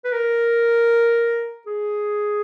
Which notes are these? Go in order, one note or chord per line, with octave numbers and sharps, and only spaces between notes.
B4
A#4
G#4